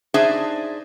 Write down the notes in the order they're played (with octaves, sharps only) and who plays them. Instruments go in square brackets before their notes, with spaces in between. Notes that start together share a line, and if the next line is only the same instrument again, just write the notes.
[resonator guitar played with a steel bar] D4 D#4 G#4 C5 D5 E5